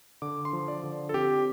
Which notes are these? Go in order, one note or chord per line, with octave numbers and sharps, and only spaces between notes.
D3 D6
C6
F3
D5
D3
A4
C4 G4